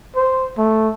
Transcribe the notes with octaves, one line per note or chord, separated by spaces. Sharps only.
C5
A3